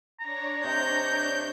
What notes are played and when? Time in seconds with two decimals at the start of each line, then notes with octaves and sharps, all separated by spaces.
0.20 D4 C#5 A#5
0.64 C3 D#5 G6